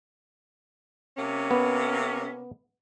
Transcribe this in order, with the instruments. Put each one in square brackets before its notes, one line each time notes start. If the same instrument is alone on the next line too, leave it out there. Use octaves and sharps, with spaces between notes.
[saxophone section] C3 A#3 C#4
[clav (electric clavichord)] B3